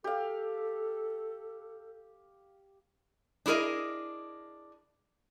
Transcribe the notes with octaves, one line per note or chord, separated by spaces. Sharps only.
G4 A4 F5
D4 E4 G#4 A#4 D#5